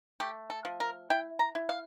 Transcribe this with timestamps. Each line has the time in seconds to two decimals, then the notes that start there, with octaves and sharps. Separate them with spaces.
0.20 A3 G4
0.50 A4
0.65 F3
0.80 A#4
1.10 E4 G5
1.39 A#5
1.55 E4
1.69 F5